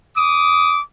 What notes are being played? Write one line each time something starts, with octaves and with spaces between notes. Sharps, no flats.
D6 D#6